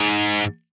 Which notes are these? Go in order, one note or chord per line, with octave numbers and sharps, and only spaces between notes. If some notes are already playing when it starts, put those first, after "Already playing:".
Already playing: G#2